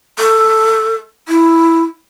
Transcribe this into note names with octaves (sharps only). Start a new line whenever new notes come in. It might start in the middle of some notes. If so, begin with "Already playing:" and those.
A4
E4